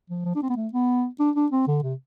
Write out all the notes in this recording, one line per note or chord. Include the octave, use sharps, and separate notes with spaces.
F3
F3
D4
C4
B3
A3
B3
D4
D4
C4
D3
C3